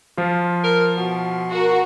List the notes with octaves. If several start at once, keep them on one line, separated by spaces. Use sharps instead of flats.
F3 F4
A#4
B2
F#4 A#4